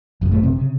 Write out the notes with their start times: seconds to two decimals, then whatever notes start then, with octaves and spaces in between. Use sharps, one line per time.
0.21 G#1 F#2 C#3
0.32 A2 A3
0.43 C3 C4
0.56 C#3